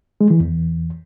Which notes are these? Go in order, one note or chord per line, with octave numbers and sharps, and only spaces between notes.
G#3
E3
E2